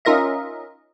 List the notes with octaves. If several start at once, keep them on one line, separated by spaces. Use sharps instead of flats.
C#4 D#4 F4 A#4 D#5 E5